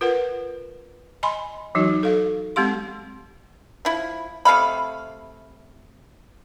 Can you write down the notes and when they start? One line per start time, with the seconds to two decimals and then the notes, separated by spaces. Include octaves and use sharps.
0.01 F4 A#4 B4 F#5
1.23 D#5 G#5 B5 C6
1.75 E3 F#3 D#4 F#4
2.03 A4 F5
2.56 G#3 C4 G4 F5 C6
3.85 F3 E4
4.45 C3 A3 F5 B5